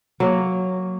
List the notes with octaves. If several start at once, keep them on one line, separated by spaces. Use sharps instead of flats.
F#3 A#3